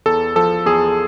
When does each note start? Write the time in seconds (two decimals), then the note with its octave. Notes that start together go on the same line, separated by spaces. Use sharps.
0.06 E2 A4
0.36 F3 A4
0.66 E2 G#4